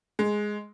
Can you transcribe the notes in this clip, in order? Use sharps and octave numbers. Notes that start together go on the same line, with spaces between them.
G#3